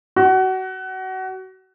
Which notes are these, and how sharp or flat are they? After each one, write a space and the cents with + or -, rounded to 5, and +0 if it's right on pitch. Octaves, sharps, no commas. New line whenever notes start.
F#4 +25